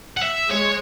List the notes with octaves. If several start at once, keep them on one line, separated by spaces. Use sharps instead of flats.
F#5
E5
G#3 C#5